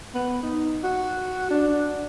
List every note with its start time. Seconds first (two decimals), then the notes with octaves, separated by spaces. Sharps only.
0.14 B3
0.43 D#4
0.84 F#4
1.50 D4